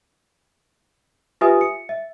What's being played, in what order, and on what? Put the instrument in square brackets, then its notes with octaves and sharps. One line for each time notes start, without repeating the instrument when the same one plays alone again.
[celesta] F4 G4 B4 E5 G#5 D#6
C#7
E5